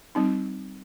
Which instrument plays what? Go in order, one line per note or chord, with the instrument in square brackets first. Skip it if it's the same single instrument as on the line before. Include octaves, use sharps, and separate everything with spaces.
[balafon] G3 C4 D#4